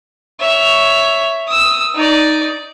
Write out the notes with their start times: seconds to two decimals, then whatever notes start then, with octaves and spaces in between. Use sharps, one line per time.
0.40 C#5 E5
1.48 D#6 E6
1.95 D#4 D5